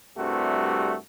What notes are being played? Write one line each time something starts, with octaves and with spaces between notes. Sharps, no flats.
C2 G2 C3 A3 F#4